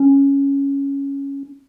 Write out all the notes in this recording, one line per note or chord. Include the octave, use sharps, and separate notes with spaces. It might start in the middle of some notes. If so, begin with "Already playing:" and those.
Already playing: C#4